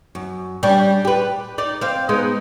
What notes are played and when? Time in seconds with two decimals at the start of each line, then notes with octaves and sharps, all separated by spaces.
0.15 F#2
0.63 G3 C#4 D4
1.05 G4 B4
1.58 D#4 D5
1.81 C4 F5
2.09 G#3 B3 D#4